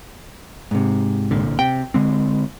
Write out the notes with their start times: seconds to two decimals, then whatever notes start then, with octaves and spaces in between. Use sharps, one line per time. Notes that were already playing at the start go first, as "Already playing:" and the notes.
0.71 G#2 C3
1.31 C2 A#2 D3
1.59 C3 G5
1.94 D3 G#3 C4